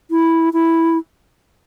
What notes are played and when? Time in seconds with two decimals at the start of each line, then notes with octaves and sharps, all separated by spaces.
0.11 E4
0.53 E4